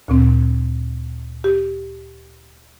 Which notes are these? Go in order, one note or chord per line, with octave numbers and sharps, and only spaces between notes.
D2 A#2 C4
G4